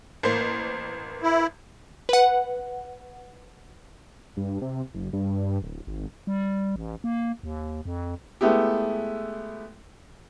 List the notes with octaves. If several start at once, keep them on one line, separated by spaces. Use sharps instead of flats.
A1 A#3 C5
E4
B4 F#5
G2
C3
F#1
G2
D1
G#1
G3
A1
A#3
D#2
F2
G#3 A3 B3 E4 G4